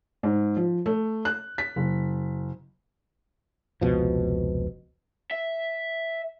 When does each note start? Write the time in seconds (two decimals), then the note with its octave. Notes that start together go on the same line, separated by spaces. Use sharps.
0.23 G#2
0.56 F3
0.86 A3
1.25 F#6
1.58 B6
1.76 F#1
3.81 F1 C#2 B2 F3
5.31 E5